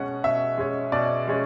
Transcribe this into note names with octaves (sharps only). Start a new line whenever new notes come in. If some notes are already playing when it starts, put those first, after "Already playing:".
Already playing: B2 G#3 C#4 F#5
B2 E5
G#3 C#4
B2 D5
G#3 C#4